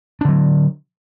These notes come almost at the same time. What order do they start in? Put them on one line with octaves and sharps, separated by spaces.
D4 D3 F#3